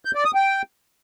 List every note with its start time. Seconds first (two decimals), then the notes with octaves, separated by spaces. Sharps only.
0.05 G6
0.15 D5
0.25 D#6
0.35 G5